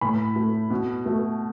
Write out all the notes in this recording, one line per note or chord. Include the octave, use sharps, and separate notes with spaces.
A2 B5
A3
B2
A3